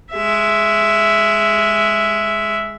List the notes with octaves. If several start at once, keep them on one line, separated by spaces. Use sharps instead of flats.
G#3 E5